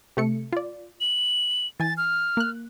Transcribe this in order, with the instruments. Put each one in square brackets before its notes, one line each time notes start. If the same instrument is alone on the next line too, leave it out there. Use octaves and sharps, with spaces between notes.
[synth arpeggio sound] C3 A3 C#7
F4 D5
[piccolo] F#7
[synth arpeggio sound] E3 G#5 [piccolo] A6
[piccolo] F6
[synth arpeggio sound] A#3 F#6